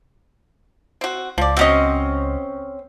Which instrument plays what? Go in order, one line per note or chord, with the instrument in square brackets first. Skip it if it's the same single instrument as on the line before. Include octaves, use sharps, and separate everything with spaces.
[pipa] C4 F#4
[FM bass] C#2 [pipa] F3 D5
[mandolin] C4 C#4 [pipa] F#4 D#5